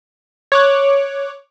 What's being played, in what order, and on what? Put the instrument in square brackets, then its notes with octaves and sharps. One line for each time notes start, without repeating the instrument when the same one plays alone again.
[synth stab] C#5 D6 F#6